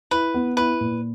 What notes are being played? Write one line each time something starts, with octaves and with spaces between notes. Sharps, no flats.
E4 B4
B3
E4 B4
A#2